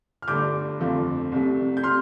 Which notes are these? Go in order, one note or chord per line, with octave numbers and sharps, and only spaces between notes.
F6
G1 G2 D3 A3 D6 G6
G1 F2 F3 A3
C2 C3 A3
G6
C3 C6 F6